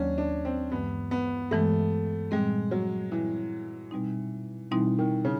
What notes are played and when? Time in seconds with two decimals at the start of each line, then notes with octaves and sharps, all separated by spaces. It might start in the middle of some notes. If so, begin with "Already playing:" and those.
Already playing: D#2 D#3 F#3 A#3 C#4 D4
0.18 D4
0.45 C4
0.72 G2 E3 G#3 B3
1.11 B3
1.51 G2 E3 G#3 A3
2.31 A#2 G3 G#3 C4
2.71 F#3
3.11 A#2 E3 G3 C4
3.91 B2 G3 C4 D#4
4.71 B2 E3 G3 C4 D#4
4.99 D#3
5.25 C#3